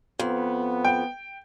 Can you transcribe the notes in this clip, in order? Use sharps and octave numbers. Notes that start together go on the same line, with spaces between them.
F2 B3
G5